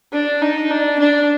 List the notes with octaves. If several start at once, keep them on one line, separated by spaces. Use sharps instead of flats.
D4
D#4
D4
D4